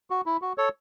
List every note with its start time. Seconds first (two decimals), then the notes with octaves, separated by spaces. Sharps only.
0.10 F#4
0.26 E4
0.42 F#4
0.58 A4 C#5